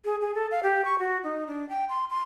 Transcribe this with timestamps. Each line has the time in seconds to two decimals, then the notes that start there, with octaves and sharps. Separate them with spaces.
0.05 G#4
0.21 G#4
0.35 A4
0.51 F5
0.63 G4
0.85 C#6
0.99 F#4
1.24 D#4
1.47 D4
1.69 G5
1.89 C6
2.10 C6